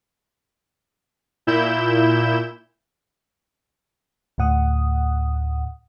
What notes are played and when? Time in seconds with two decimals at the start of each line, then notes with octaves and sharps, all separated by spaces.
1.47 A#2 E4 G6 E7
4.38 D2 A2 F#5 D#6